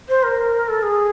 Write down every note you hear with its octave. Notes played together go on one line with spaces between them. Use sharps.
C5
A#4
A4
G#4